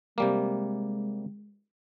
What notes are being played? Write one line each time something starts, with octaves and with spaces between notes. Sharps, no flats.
C3 G3 G#3 A#3